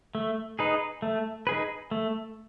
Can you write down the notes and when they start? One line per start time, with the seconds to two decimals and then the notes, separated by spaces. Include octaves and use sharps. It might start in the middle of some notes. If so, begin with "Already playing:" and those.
0.15 A3
0.59 D#4 G#4 B4
1.02 A3
1.47 D#4 G#4 B4
1.91 A3